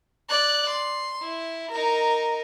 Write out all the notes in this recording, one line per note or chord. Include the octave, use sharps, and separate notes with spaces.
D5 F#6
C6
E4
D#4 A#4